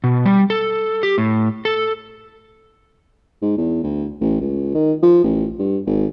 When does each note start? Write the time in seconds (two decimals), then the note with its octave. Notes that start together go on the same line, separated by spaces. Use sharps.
0.04 B2
0.25 G3
0.50 A4
1.03 G4
1.18 A2
1.65 A4
3.42 G#2
3.58 E2
3.83 D2
4.21 A1
4.41 C#2
4.75 D#3
5.03 F3
5.24 A1
5.59 G2
5.87 G#1